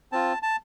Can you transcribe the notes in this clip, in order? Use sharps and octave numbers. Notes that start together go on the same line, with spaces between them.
C4 F4 A5
A5